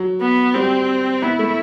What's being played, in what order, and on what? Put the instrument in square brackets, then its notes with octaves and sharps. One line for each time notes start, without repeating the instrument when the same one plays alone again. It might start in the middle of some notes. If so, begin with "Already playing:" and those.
Already playing: [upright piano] F#3
[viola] B3
[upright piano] G3 [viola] C4
[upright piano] B3 [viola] E4
[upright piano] A3